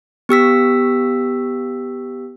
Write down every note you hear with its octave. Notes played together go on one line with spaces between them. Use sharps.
B3 G4 E6 B6